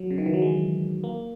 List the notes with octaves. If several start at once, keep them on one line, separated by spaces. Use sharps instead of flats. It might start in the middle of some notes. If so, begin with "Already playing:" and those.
Already playing: F#3
C#3
D#3
E3
F#3
G#3
A#3